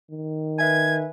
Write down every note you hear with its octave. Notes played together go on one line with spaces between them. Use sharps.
D#3
B4 E5 G#5 G#6